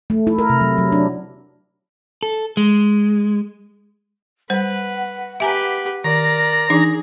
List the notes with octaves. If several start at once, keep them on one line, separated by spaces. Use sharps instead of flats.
A3
E4
A#4
C3
F#3
F#3
D4
A4
G#3
G3 B4 C5 F#5
G4 B4 E5 G#5 A#5
D#3 A#4 D5 A#5
E3 D4 D#4 G#4